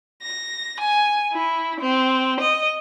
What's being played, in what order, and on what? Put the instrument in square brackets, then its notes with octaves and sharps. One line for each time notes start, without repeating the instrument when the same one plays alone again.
[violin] A#6
G#5
E4
C4
D#5